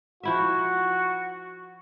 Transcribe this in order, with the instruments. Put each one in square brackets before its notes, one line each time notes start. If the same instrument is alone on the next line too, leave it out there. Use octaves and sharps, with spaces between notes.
[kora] F3 E4 E5 [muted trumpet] F#4